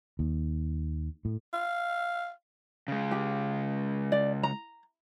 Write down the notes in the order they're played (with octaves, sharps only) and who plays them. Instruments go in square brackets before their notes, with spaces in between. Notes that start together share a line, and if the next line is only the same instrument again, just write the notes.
[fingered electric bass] D#2
A2
[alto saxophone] F5
[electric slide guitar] C#3 G#3
[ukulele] G4
D5
A#5